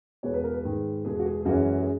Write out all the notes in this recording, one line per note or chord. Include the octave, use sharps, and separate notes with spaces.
E2 B2 G#3 B3 C#5
B4
A#4
B4
G#2 D#3 G#3
E2 B2 G#3 G#4
F#4
G#4
G#4
F#2 E3 G#3 C#4 F#4
G#4